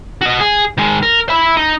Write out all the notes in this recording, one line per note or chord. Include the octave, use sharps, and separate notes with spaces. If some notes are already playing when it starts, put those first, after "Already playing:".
F#4 D#5
G#4
D#3 G#3
A#4
E5 B5
D#4